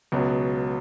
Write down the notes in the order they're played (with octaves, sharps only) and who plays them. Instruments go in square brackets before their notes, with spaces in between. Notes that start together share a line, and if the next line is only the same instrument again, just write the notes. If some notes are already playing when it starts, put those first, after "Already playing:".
[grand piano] C#2 B2 F#3